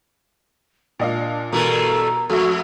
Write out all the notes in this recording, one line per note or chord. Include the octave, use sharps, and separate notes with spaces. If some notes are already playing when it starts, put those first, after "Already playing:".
A#2 D4 D#5 F5
G2 B2 E3 A3 A#4 A#5
F2 A3 F#4 E5